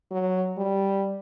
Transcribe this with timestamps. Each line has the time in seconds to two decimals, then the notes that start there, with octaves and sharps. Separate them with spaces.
0.11 F#3
0.57 G3